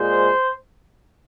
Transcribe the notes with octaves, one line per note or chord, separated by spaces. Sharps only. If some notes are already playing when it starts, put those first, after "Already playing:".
Already playing: A#2 G#3 C5